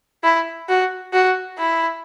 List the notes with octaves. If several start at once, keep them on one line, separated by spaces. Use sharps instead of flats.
E4
F#4
F#4
E4